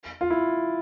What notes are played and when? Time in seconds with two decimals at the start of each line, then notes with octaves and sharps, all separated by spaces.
0.21 F4
0.30 E4